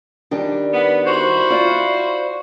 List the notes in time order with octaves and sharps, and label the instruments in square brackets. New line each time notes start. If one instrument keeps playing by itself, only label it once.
[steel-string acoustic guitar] D#3 G3 D4
[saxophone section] B3
E4 F#4 C5
[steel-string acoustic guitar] F4 D5